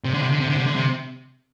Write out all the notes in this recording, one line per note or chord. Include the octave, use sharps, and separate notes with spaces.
C3
D3
C3
D3
C3
D3
C3
D3
C3